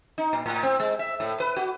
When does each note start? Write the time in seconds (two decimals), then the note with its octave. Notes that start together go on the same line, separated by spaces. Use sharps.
0.18 D#4
0.33 A#2
0.46 A2
0.63 C4
0.80 G#3
0.99 E5
1.20 A2
1.40 B4
1.56 F#4